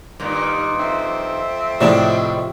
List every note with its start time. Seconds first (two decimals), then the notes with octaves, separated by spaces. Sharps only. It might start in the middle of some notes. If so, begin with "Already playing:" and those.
0.20 G2 A#2 D#3
0.79 F2 C4 E5
1.81 A2 C3 F3 G#3 D4 E4 D5 E7